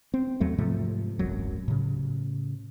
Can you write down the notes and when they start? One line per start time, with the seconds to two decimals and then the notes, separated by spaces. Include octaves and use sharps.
0.14 C4
0.40 E2 F#3 A3
0.58 G#2 C3 F3 A3
1.19 D1 G#1 F#2 F#3
1.68 A2 C#3